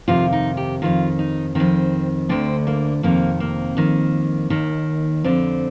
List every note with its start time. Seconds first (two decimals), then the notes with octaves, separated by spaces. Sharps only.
0.08 F2 C3 D#3 F4
0.32 D#4
0.57 G4
0.82 F2 D#3 F4
1.19 D#4
1.55 F2 D#3 C4
2.29 D2 D3 C4
2.67 A#3
3.03 F2 C3 D#3 A#3
3.40 A#3
3.77 F2 D#3
4.50 D#2 D#3
5.24 F2 D3 C4